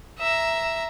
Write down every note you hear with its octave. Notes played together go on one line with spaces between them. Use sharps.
E5 A#5